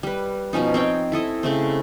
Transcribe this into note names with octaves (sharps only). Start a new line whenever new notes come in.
G3 B4
B2 F3 C#4 D#4
C4 C#5 G5
E4 A4 D#5 E5
C#3 A3 C4